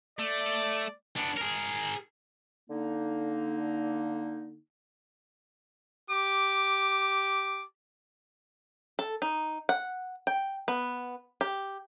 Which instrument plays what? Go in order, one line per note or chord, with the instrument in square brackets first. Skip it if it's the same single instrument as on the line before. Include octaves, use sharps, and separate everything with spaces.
[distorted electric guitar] A3 [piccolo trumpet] D5
[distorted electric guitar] B3 D4
G#4 A#4
[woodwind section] D3 A#3 D#4
[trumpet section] G4 D6
[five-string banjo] A4
D#4
F#5
G5
B3
G4